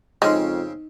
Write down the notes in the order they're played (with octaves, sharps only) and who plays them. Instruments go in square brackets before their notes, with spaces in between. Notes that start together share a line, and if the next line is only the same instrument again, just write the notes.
[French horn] F2 [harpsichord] C#3 C4 C#4 [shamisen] G#3 [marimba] D#4 D#5